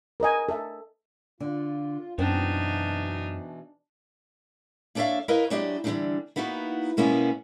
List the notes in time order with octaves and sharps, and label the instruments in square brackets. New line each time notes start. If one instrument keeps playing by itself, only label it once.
[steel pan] A#4 B4 D#5 G#5
A4 E5
[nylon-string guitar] D3 [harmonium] F4
[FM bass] F#2 [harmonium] B2 E3 [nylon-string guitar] B3 C4 [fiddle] D4 D#4
[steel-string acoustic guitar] A#3 D4 A4 C#5 E5 F5
E4 A#4 B4 C#5 D#5 F5
F#3 G#3 D4 E4 G4 D#5
D3 E3 G3 A3 D4 D#4
A#3 B3 D#4 E4 F#4
B2 G#3 A#3 B3 C#4 E4